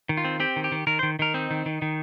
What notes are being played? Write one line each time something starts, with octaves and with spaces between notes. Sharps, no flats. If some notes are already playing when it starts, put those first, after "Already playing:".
D#3
F4
C4
C4 G4
D#3
G4
D#3
D#3 A#4
D#3 C5
D#3 A#4
C4 D#4
D#3
D#3
D#3